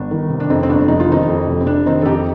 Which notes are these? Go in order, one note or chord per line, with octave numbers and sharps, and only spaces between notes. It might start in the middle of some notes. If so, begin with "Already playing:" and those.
Already playing: G1 D4
D#3
C3
D4
F2 C4 D#4
C4
G1 D4
F1 D#4
F4
D#3 C4 D#4
F2
F1
C4
F1 D4
D#3 C4 D#4
A4
F2 D#4 G4